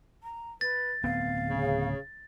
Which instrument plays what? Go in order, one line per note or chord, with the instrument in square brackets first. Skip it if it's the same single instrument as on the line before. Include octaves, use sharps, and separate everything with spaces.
[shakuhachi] A#5
[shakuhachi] B4 [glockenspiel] A6
[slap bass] D1 B3 C4 [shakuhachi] F5
[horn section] C#3